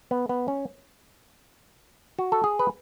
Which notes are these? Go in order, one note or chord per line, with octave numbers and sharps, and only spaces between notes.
B3
B3
C#4
F#4
A4
G#4
B4